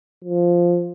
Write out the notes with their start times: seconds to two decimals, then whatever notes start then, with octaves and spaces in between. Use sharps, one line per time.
0.24 F3